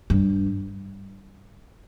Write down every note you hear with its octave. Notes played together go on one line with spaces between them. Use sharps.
G2